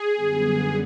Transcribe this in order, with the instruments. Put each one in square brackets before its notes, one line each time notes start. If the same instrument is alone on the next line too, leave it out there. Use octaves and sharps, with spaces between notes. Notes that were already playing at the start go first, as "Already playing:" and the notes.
Already playing: [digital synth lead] G#4
[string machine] F#2 D3 G3 B3